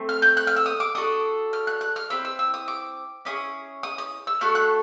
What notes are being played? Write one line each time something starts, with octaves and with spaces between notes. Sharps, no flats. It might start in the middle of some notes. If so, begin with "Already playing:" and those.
Already playing: A3 C4
F6
G6
F#6
F6
E6
D#6
D6
D4 F#4 A4 D#6
F6
F#6
F#6
F6
C4 E4 E6
E6
E6
D#6
D6
C#4 E4 G#4 D#6
D#6
D#6
E6
A3 D4 F#4 A4 F6
F#6